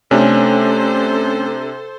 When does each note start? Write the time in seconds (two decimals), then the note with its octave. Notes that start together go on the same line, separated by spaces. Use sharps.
0.11 C3 A3 C#4 D4 A4 C5